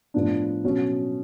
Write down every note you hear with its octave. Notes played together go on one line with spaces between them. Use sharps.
A2 F3 B3 D4
B2 F#3 C#4 F#4